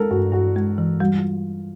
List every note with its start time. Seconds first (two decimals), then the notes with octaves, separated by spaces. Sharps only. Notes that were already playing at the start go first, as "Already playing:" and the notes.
Already playing: G#3 A4 A#4
0.11 G2 F#4
0.33 G2 F#4
0.56 G#3
0.78 E3
1.00 G3 F#4
1.18 F4